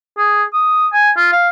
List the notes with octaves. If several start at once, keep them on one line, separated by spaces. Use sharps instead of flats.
G#4
D#6
G#5
F4
F5